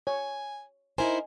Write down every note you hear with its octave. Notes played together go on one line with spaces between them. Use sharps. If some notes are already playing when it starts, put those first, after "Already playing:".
C#5 G#5
D#4 E4 A#4 C5 G#5